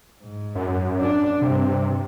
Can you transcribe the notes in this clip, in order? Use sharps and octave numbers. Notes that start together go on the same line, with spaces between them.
G#2
F#2
D4
G2 C3